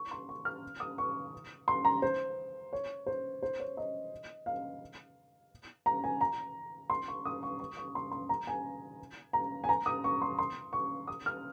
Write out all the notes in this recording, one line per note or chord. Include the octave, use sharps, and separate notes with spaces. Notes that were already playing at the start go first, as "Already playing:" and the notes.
Already playing: C#6
C6
C#6
F6
D#6
C#6
C6
A#5
C5
C#5
C5
C5
C#5
D#5
F5
A#5
G#5
A#5
C6
C#6
D#6
C#6
C#6
C#6
C6
C6
A#5
G#5
A#5
G#5
A#5
D#6
C#6
C6
C6
C#6
D#6
F6